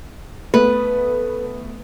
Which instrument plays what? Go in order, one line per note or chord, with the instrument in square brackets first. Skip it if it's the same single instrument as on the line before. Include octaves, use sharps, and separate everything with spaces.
[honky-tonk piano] A3 B3 [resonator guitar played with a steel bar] B4